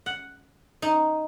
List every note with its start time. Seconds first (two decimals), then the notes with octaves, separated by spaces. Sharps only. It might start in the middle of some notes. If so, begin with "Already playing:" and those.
0.06 F#5
0.82 D#4